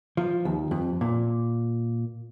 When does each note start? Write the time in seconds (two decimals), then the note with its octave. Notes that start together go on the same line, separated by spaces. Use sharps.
0.17 F3
0.45 D#2
0.71 F2
1.01 A#2